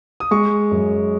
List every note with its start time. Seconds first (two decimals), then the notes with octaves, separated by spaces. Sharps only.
0.20 D#6
0.31 G#3 C#6
0.71 F#2